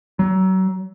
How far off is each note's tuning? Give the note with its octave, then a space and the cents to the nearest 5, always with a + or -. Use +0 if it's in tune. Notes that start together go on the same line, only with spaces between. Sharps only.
F#3 +30